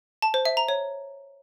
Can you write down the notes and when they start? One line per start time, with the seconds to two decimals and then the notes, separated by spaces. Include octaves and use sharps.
0.22 A5
0.34 C5
0.45 E5
0.57 A#5
0.68 C#5